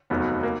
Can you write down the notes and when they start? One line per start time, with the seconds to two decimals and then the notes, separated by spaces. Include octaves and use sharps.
0.10 F1 D#2 D#3 F#3 B3
0.43 A#3